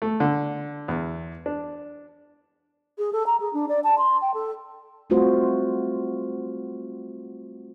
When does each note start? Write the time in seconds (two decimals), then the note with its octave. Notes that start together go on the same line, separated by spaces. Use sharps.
0.02 A3
0.20 D3
0.88 E2
1.46 D4
2.98 G#4
3.13 A4
3.26 A#5
3.40 G#4
3.53 D4
3.69 D5
3.84 A5
3.98 C6
4.21 G5
4.34 A4
5.10 G3 A3 C4 F4 F#4 C5